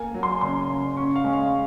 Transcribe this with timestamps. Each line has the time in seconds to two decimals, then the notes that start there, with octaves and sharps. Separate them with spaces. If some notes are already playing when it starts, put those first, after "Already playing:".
Already playing: A#3 G#5
0.14 F#3
0.23 C6
0.41 C#3 C6
0.70 C#3
0.97 C#4 C#6
1.16 F5
1.24 G#3
1.33 F5